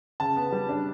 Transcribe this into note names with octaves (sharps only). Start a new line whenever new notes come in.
C#3 A5
B3
G3
D4